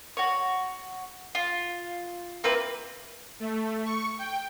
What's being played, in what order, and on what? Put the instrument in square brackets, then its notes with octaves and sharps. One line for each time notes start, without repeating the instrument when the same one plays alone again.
[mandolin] F#4 C#5
F4
A#3 C4 E4 B4
[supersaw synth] A3
C#6
G5